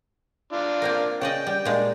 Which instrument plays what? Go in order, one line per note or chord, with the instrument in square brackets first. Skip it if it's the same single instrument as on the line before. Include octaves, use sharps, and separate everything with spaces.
[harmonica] D4 F4
[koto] A#3 C4 A#4
[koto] C#3 D5 D#5 [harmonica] G5
[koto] G3
A#2 G#3 D4